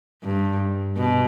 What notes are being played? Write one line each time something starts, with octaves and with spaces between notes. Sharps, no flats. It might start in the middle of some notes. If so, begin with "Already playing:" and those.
G2
B2